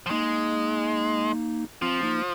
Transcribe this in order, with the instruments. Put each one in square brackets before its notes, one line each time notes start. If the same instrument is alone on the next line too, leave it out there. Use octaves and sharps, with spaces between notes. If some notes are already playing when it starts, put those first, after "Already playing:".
[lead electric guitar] F3
[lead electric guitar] G#3 [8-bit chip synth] A#3 D#4
[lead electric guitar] F3 [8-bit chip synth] C4 F4
[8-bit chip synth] A#3 D#4